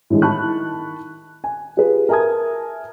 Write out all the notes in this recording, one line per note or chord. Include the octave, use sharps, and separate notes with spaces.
A2 D3 E3 G#3
D#3 E4 A5 B5 C#6 F#6
G#5
F4 G4 G#4 B4
A#4 E5 G#5 A5 D#6 G#6